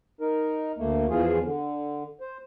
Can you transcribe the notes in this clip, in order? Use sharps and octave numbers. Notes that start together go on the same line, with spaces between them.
D#4 A#4
D2 A3 A#3
E2 E3 F3 F4 G#4
D3
C5